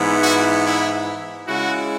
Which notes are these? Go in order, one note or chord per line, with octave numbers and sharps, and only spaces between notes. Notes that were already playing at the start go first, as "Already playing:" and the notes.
Already playing: G#2 E3 B3 E4
F#4
E4
C#3 G#3 E4 F#4